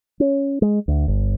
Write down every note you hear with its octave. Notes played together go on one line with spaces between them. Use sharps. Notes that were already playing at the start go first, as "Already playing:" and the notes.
C#4
G#3
D2
G1